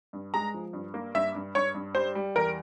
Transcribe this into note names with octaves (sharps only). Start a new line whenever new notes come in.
G2
G#3 A#5
F3
G2
A#3
G2 E5
G2
G2 C#5
G2
G3 C5
G3
E2 A#4